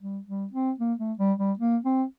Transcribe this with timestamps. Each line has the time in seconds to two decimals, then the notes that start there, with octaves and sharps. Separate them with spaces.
0.01 G3
0.27 G3
0.53 C4
0.80 A#3
0.99 A3
1.19 G3
1.39 G3
1.59 A#3
1.85 C4